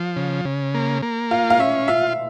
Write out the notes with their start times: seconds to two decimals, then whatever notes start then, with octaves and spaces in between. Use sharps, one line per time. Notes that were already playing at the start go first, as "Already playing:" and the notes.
Already playing: F3
0.16 C#3
0.45 C#3
0.74 A#3
1.03 A#3
1.31 F4 F5
1.50 F5
1.60 C#4 E5
1.88 F4 E5